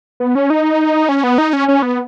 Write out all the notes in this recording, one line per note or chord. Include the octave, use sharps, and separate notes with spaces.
B3
C#4
D#4
C#4
B3
D#4
C#4
C#4
B3